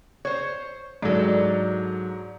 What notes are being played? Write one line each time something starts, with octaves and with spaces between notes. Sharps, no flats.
C5 C#5
G#2 F#3 D4 A4